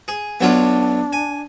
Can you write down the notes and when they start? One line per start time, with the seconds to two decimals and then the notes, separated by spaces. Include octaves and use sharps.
0.08 G#4
0.41 B1 F#3 D4 F4
1.13 G#5